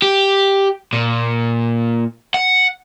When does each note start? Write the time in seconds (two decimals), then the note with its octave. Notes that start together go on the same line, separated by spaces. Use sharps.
0.02 G4
0.93 A#2
2.34 F#5